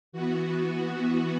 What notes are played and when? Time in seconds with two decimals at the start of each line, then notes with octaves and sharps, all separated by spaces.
0.12 E3 B3 F#4
0.81 F#4